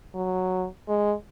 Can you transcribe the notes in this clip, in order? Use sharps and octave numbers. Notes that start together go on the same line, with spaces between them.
F#3
G#3